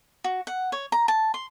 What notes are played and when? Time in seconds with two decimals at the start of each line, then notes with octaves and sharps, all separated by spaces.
0.24 F#4
0.47 F#5
0.72 C#5
0.92 A#5
1.08 A5
1.34 C6